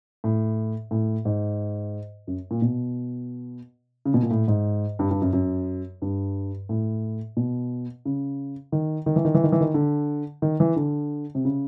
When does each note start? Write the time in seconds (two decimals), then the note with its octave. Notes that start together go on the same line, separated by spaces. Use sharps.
0.24 A2
0.91 A2
1.25 G#2
2.27 F#2
2.51 A#2
2.62 B2
4.05 C#3
4.14 B2
4.23 A#2
4.31 A2
4.48 G#2
4.99 G2
5.11 G2
5.22 F#2
5.33 F#2
6.02 G2
6.69 A2
7.37 B2
8.05 C#3
8.72 D#3
9.06 D#3
9.16 E3
9.25 D#3
9.35 E3
9.44 D#3
9.52 E3
9.61 D#3
9.74 D3
10.42 D#3
10.60 E3
10.76 D3
11.35 C3
11.45 C#3